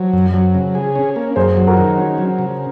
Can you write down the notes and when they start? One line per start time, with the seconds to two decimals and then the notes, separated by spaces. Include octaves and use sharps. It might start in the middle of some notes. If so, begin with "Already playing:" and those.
Already playing: F#3 C5
0.13 F#2
0.34 F#3
0.54 C#3
0.75 G#4
0.95 C#4
1.16 A#3
1.36 F#2 G#4 C5
1.57 F#3
1.67 F#4 A#4
1.77 D#3
1.98 C#4
2.18 F#3
2.39 C#3